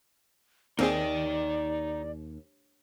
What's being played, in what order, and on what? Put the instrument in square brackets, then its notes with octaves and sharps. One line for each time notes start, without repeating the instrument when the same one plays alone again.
[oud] D#2 [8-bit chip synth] A#3 C4 G#4 [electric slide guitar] D#4 G5 [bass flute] D5